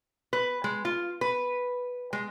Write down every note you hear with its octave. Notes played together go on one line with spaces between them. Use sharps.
B4
G#3
F4
B4
G#3